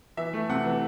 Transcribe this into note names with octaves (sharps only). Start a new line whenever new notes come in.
E3 E5
A3
C3 F#5
E3